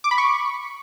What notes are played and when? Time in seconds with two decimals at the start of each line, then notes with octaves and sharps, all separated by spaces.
0.04 D6
0.11 B5
0.18 C#6